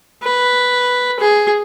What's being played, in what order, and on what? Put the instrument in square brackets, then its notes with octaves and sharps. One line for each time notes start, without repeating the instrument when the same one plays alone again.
[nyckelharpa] B4
G#4